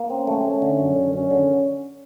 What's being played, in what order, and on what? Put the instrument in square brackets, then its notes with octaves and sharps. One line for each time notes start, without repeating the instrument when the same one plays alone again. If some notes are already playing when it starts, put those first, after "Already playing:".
Already playing: [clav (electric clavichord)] A#3
[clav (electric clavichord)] C4 [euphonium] C#4
[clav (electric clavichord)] A3
A3
D3
F#2
D3
[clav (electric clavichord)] F#2 [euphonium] C#4
[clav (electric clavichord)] D3